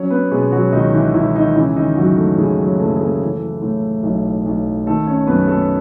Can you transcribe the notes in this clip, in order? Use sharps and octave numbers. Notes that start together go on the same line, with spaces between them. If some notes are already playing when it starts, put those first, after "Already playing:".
Already playing: F#3 C#4 C#5
B3 B4
B2 G#3 G#4
F#3 F#4
C#2 D#3 D#4
E3 E4
C#2 E3 E4
D#3 D#4
C#3 E3 E4
D#3 D#4
F#2 F#3 F#4
A3 A4
E3 G#3 G#4
F#3 F#4
F#1 A3 A4
G#4
A3 A4
E3
A2
B1
B1
D#3 A3 A4
C#4 C#5
F#2 B3 B4
A3 A4